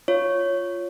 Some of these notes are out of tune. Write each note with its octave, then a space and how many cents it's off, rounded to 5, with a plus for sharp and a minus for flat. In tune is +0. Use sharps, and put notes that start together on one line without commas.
F4 +0 C#5 +0